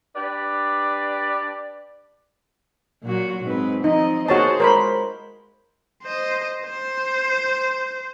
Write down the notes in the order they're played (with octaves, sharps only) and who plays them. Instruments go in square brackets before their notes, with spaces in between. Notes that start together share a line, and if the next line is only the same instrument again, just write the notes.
[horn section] D4 G4 B4 D5
[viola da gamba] A#2 F#3 F#4
G#2 C4 B4
[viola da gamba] F3 C4 D#5 [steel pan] D#4
[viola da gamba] A#3 G#4 C5 [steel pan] F#4 C#5 A5
[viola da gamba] G#3 [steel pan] A#4 C5 B5
[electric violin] C5 D#5
C5